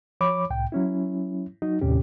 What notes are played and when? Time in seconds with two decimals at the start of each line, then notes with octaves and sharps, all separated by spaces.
0.21 F3 C#5 B5 D6
0.50 C2 A2 G5
0.72 F#3 C#4 E4
1.62 F#3 D#4 F#4
1.81 D#2 A2 C3 C#4 G4